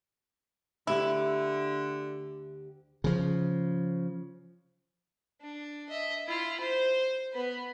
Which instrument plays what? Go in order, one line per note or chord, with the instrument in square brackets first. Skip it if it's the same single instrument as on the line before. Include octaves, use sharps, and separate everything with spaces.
[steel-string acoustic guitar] D2 G4 [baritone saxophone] D3 [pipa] E4
[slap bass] C#3 F3
[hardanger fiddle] D4
D#5 E5
E4 F4
C5
B3 B4